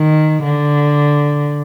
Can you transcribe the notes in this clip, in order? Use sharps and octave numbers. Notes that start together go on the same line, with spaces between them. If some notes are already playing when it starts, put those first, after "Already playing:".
Already playing: D#3
D3